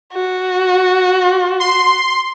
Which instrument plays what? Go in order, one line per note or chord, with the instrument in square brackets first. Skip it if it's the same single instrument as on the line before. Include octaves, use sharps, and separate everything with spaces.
[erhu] F#4
[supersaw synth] C6